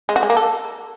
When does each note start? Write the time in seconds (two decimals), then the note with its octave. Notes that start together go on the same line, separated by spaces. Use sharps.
0.09 G#3
0.16 F#4
0.23 G#3
0.30 A#3
0.37 A4